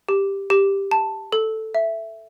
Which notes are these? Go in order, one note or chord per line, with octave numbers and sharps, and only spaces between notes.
G4
G4
A5
A4
E5